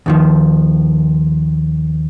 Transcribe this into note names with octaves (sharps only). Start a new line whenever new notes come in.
D#2 D#3 F3